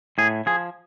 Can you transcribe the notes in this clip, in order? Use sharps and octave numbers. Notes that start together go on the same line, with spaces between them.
A2 G#4
F3 G#4